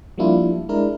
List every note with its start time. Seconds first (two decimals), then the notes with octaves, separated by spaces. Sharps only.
0.18 F3 G3 A#3 D4 E4 F4
0.69 G#3 D4 E4 A#4